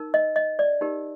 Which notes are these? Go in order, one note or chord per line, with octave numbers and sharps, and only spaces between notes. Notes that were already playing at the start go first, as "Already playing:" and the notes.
Already playing: D#4 A#4
D#5
D#5
D5
D#4 G4 A#4